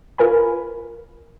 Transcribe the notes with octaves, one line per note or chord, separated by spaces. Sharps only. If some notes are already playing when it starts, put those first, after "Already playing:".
F4 A#4 B4 G#5 B5